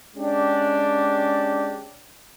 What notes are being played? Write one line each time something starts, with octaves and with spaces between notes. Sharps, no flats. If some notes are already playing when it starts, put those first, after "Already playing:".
G#3 C#4 D4 G4